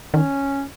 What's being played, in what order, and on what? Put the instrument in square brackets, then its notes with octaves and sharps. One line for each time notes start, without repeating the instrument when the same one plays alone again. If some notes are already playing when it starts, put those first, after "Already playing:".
[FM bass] D#3 [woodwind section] C#4